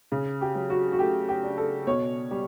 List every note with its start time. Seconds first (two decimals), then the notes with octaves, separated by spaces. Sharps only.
0.12 C#3
0.41 G4
0.55 F#3
0.70 F#4
0.92 F#4
0.99 A3 G4
1.29 G4
1.43 D4
1.58 A4
1.87 B2 C#5
2.31 G3